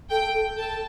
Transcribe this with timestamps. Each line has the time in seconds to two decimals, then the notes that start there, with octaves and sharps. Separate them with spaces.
0.10 A4 G5
0.34 A4
0.57 A4 A5